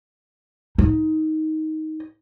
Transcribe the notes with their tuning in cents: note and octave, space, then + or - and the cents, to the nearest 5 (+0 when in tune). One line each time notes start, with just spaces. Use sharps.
D#4 +15